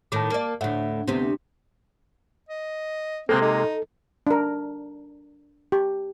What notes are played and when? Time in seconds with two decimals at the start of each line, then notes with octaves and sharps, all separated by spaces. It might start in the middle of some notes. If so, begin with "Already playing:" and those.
0.12 A2 D#3 A5 D6
0.30 A#3 D5
0.61 D2 A2 E5 F#5
1.08 D2 C3 B3 C4 D4
2.49 D#5
3.29 C3 G#3 A#3 C4 A4
3.42 D#4
4.27 D4 A#4
5.72 G4